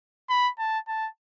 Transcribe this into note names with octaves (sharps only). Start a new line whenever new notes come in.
B5
A5
A5